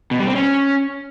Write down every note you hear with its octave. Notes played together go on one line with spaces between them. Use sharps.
B2
G3
C4
C#4